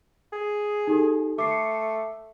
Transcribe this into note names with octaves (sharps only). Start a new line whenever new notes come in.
G#4
D#4 G4 A4
A3 D6 C7 C#7